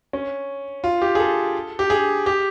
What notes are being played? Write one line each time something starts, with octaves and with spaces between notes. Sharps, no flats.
C#4
F4
G4
G#4
A4
G4
G#4
G4